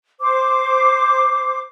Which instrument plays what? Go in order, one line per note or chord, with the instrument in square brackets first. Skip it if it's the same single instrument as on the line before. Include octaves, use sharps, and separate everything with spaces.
[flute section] C5 D6